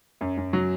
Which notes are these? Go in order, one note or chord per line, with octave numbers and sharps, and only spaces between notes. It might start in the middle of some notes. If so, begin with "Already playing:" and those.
F#2
F#2
F#3